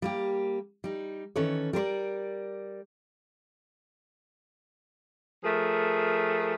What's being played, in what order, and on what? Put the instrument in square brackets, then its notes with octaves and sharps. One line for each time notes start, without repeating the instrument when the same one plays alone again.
[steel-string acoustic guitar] G3 A#3 G4
G3 D#4
D#3 E3 C#4 A4 B4 C#5
G3 A#4 C5 D5
[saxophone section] F3 A3 G#4 A#4